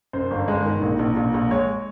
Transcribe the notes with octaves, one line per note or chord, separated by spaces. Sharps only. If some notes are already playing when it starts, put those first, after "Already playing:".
F#2 C5
G1
G#3
D#3
A#1
A#1
A#1
A#1
G#3 C#5